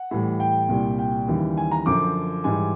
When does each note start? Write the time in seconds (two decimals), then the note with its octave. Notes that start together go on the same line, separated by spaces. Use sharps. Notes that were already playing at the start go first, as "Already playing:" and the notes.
Already playing: F#5
0.11 A2 E3 G3
0.40 G5
0.69 C2 A#2 G3
0.99 G5
1.28 D#2 C#3 E3 G3
1.57 G#5
1.72 A#5
1.86 F#2 D3 F3 D6
2.44 G#2 E3 G3 G#5